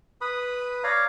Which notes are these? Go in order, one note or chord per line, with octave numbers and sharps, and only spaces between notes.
B4 B5 D#6
C#5 D5 F5 A#5